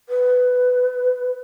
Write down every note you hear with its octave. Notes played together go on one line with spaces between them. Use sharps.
B4